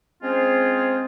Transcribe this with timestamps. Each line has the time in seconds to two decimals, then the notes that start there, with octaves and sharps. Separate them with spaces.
0.23 G#3 C4 C#4 F4 G#4 C5